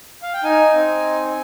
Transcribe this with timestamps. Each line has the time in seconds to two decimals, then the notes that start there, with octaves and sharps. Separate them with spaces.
0.22 F5
0.34 G5
0.44 D#4 G#5
0.74 C4